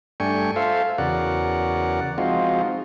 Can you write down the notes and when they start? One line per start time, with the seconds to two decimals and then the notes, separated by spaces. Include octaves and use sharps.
0.20 G2 A3 D4 G5 G#5 C#6
0.56 F4 A4 C5 E5 F5
0.98 E2 C#3 F#4 A#4 D5 F#5
2.18 F3 G#3 C4 D#4 F4 F#4